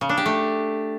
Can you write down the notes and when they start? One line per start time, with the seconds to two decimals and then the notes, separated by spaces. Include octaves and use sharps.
0.01 C#3
0.09 D4
0.17 G4
0.26 A3